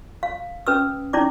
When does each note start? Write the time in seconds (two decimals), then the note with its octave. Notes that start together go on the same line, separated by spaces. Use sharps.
0.23 F5
0.67 C#4 B4 D#6 E6
1.13 C#4 D#4 E4 D5 D6